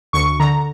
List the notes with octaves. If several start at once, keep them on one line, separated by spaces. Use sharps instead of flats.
D2 C#6
D3 A#5